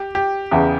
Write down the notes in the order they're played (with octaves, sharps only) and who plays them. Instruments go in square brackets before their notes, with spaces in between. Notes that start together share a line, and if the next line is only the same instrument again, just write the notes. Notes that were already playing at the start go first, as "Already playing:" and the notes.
Already playing: [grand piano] G4
G4
[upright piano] E2 C#3 E3